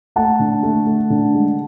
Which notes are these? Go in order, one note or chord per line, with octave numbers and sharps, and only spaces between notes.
A3 F#5 A5
D3
A3
A3
D3
G#3